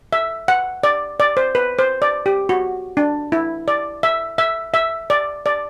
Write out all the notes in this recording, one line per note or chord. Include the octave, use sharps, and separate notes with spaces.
E5
F#5
D5
D5
C5
B4
C5
D5
G4
F#4
D4
E4
D5
E5
E5
E5
D5
D5